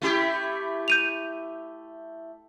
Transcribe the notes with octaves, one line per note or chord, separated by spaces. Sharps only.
A3 E4 G4
G6 D#7 F7